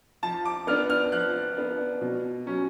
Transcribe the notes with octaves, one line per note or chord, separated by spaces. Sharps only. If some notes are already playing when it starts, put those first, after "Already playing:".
F3 A5
D6
B3 D4 F6
F6
F3 F#6
B3 D4
B2
F#3 C#4